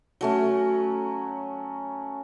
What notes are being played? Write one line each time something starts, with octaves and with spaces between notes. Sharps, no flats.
F#3 A3 C#4